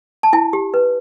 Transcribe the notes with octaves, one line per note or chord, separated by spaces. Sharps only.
A5
E4 G#5
G4
B4